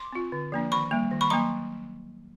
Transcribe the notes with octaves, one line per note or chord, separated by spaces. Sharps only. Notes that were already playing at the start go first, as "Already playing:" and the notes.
Already playing: C6 D6
C4 F4
D3
F3 A#3 D4
D#3 B5 C#6
G3 A#3
D#3
B5 C#6
F#3 A#3 A#5 C6